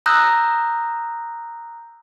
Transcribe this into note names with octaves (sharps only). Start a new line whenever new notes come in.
A#5 D#6 E6 F#6 G6 A#6